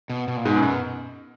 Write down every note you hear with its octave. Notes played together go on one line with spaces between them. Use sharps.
B2
B2
A#2
G#2 B2
F#2
B2